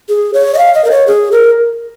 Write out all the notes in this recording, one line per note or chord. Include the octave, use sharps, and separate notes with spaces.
G#4
C#5
D#5
F5
D#5
A#4
C#5
G#4
A#4